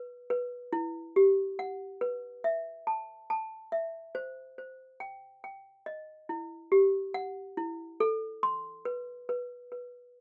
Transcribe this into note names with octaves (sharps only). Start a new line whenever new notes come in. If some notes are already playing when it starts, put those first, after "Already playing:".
Already playing: B4
B4
E4
G4
F#5
B4
E5
A5
A5
E5
C5
C5
G5
G5
D#5
E4
G4
F#5
E4
A4
C6
B4
B4
B4